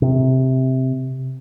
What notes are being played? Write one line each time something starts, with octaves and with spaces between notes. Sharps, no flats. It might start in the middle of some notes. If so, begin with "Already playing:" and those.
C3